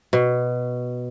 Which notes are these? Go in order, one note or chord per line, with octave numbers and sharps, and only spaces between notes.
B2